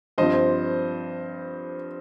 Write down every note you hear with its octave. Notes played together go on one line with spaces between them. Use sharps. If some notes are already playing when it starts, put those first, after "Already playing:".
G2 F3 C4 C5 D#5